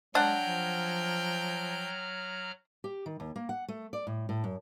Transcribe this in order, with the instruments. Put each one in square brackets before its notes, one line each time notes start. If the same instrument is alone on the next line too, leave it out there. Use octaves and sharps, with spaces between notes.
[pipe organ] F#3 A#5 F6 [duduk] G#3 [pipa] D4 F#5 [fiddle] G5
[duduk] F3
[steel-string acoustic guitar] G4
D#3
D#2
A#3
F#5
A3
D5
A2
A2
F#2